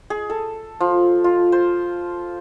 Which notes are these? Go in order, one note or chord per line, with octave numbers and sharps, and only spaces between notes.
G#4
A4
F3
F4
C5